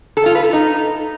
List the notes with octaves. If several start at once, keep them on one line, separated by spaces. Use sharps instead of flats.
A4
F4
B4
A4
D#4